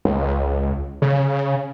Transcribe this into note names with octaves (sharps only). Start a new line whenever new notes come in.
C#2
C#3